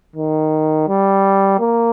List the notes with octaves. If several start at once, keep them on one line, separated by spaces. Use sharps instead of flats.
D#3
G3
A#3